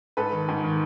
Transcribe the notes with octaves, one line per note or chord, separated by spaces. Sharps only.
G#2 A4 B4
D#3
G#2
D#3